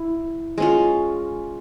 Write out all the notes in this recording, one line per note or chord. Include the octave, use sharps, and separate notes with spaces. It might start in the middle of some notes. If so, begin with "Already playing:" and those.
Already playing: E4
G#3 C#4 F4